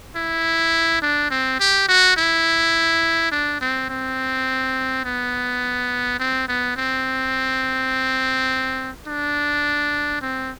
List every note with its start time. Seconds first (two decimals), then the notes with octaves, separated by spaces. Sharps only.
0.16 E4
1.02 D4
1.31 C4
1.60 G4
1.89 F#4
2.17 E4
3.32 D4
3.61 C4
3.89 C4
5.05 B3
6.19 C4
6.48 B3
6.77 C4
9.07 D4
10.22 C4